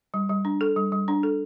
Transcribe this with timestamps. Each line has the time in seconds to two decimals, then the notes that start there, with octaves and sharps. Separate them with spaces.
0.14 G3
0.29 G3
0.45 D4
0.61 A4
0.76 G3
0.92 G3
1.08 D4
1.23 A4